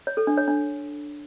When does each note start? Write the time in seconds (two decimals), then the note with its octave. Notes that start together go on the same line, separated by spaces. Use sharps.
0.07 C#5
0.17 A4
0.27 D4
0.37 C#5
0.48 D4